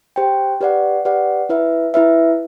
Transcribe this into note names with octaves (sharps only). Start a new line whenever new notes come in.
G4 C5 G5
G4 B4 D5 F#5
G4 B4 D5 F#5
E4 B4 E5
E4 B4 E5